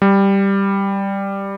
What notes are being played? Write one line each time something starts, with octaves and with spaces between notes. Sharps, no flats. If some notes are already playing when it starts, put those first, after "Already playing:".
G3